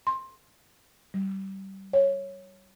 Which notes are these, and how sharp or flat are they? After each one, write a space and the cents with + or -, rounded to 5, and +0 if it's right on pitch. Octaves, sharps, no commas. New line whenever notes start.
C6 +15
G3 -25
C#5 -5